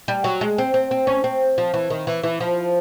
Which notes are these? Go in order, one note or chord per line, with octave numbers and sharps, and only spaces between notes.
G3
F#3
G#3
C4
C4
C4
C#4
C4
F3
E3
D#3
E3
E3
F3